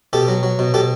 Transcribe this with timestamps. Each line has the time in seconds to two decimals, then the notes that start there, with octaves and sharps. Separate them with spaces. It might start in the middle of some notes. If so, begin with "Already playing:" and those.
0.13 B2 G4 A4
0.28 F#3
0.43 F#3
0.59 B2
0.74 B2 G4 A4